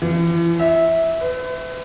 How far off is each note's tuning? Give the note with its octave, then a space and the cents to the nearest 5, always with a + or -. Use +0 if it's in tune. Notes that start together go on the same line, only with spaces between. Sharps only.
E3 +40
E5 -15
B4 +40